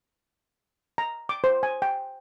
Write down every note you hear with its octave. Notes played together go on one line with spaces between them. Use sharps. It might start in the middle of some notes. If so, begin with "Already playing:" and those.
A#5
D6
C5
G#5
G5